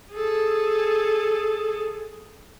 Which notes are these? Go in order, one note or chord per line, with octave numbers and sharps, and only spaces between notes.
G#4 A4